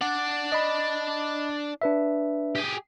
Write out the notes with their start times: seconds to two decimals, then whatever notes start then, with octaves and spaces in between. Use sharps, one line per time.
0.01 D4 D5 F#5
0.52 D#5 B5
1.82 D4 B4 E5
2.55 G4 G#4